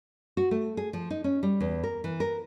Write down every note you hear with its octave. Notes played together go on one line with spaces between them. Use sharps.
F#4
A3
G#4
F3
D#4
C#4
G3
E2
A#4
E3
A#4